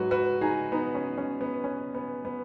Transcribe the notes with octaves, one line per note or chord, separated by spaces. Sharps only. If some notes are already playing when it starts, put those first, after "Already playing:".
Already playing: G#2 F#3 F#4 B4
F#4 B4
D#4 G#4
B3 D#4
C#4
C#4
B3
C#4
B3
B3